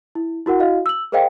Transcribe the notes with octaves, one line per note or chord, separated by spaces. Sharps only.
E4
E4 F#4 A#4 F#5
E4 F#4 D#5 F5
E6 F#7
G#4 A#4 C5 D#5 F5 G5